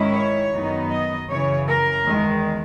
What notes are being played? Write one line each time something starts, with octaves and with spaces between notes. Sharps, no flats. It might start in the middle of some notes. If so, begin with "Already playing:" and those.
Already playing: G#2 D#3 G#3 C#4 E4
C#5
F#2 D#3 F#3 B3 D#4
D#5
F#2 C#3 E3 C#5
A#4
E2 D#3 G#3